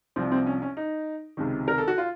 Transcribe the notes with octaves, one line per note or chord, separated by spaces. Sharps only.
C2 C3 F3 C4
C4
C#4
C#4
D#4
C#2 C3 D#3
A#4
A4
F#4
F4